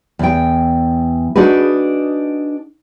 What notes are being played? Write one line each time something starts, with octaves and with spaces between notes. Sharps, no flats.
E2 G5
D4 D#4 F#4 G#4 B4